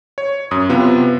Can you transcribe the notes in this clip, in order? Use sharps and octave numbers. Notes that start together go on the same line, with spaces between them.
C#5
F#2 D#6
C3 B3 F4